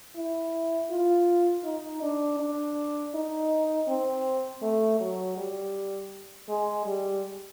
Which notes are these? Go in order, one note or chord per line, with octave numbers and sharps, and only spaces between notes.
E4
F4
D#4
D4
D4
D#4
C4
A3
F#3
G3
G#3
G3